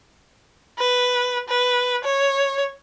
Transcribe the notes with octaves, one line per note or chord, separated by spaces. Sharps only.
B4
B4
C#5